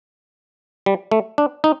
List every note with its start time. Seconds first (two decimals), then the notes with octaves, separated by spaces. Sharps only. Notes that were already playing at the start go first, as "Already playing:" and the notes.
0.86 G3
1.11 A3
1.38 D4
1.64 D#4